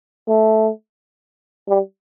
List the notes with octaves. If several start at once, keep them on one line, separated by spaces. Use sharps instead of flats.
A3
G3